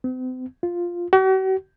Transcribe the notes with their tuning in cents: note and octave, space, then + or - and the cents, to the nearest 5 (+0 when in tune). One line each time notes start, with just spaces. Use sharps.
C4 -40
F4 +0
F#4 +45